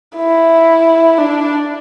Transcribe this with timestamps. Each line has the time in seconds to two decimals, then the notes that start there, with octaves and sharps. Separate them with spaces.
0.16 E4
1.18 D4